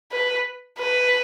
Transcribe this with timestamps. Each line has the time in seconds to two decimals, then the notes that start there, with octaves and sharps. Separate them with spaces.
0.12 B4
0.78 B4